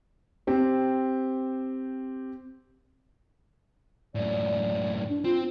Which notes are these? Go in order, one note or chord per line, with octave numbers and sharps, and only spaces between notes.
C4 G4 C5
F#2 A2 D5
D4
C4 F4